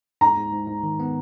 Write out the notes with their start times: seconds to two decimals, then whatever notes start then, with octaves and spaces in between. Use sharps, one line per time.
0.21 G#2 A#5
0.37 G#2
0.53 G#2
0.68 G#2
0.83 D#3
1.00 B3